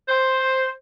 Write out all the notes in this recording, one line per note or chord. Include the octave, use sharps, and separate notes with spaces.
C5